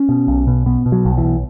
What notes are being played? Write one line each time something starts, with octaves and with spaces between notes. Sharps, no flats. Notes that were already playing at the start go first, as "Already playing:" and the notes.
Already playing: C#4
B2
B1
B2
B2 B3
B2
F#3
B1
E3
B1